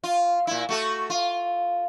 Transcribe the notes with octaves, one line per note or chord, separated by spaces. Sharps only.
F4
A#2 E4
A3 F#4 A4
F4